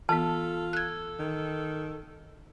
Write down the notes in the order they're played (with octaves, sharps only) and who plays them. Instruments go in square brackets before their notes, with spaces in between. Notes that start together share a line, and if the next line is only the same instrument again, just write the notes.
[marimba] E3 B3 [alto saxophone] F4 [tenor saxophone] A4 [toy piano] A5
[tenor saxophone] A4 [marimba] F#6 G#6
[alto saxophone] D#3